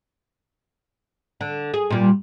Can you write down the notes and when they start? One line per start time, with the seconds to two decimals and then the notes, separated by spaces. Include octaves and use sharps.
1.41 D3
1.74 G#4
1.90 A#2 G3